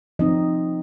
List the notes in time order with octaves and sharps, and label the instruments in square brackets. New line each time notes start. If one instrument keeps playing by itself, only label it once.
[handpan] F3 C4 D#4 D#5